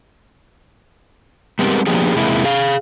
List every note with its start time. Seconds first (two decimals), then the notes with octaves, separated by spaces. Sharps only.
1.59 G3 G#3 B3 C4 G4 A#4
1.87 F3 A#3 B3 D4 G4 G#4
2.16 E2 C3 E3 G#3 A#3 E4
2.45 G#4 F5